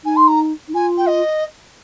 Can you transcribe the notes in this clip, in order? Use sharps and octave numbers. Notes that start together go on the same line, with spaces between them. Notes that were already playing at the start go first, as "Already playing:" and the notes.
D#4 G#5
C6
A#5
D#4
F4 G#5
G5
D#5